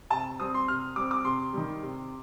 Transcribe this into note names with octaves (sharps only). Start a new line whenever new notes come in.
C3 A5
G3 C4 D#6
C6
C3 F6
G3 C4 D6
D6
C3 C6
D#3 G3
C3